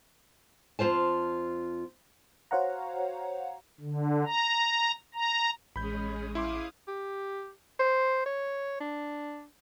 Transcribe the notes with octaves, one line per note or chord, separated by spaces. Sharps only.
F2 E3 F4 C5 A5
F#4 C5 C#5 F5 F#5 A#5
D3
A#5
A#5
A1 G#3 C#4 G#4 B5 G6
E4 F5 C6 D6 D#6
G4
C5
C#5
D4